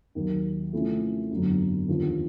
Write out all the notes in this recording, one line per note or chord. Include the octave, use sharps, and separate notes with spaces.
D#2 D#3 F#3 A#3
C3 F3 A3 C#4 E4
G1 F2 D3 F#3
D#2 D3 F3